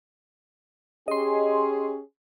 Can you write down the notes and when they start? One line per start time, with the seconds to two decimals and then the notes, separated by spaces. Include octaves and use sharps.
1.08 C#4 G4 G#4 D#5 C6